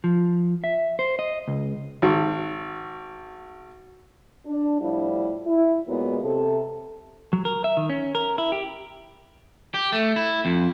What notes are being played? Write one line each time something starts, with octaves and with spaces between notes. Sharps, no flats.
F3
E5
C5
D#5
C#2
G#1 F#4
D4
A2 F3 G3 E4
E4
A#2 F#3 G#3 B3
C3 A4
F#3
A#4
E5
D#3
C#4
A#4
E4
G4
G4
A3
E4
F2